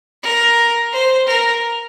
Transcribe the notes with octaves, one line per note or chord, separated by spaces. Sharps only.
A#4
C5
A#4